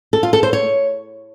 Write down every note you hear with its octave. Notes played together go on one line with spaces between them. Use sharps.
A4
F4
A4
C5
C#5